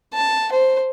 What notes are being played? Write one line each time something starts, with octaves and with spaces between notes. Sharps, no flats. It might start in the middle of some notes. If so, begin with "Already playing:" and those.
A5
C5